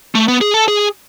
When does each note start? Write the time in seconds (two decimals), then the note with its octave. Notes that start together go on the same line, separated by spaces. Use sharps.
0.15 A3
0.28 B3
0.41 G#4
0.54 A4
0.68 G#4